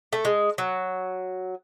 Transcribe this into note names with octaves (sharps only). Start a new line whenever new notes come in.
A3
G#3
F#3